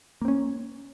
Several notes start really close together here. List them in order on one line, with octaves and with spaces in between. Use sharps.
A#3 C4 C#4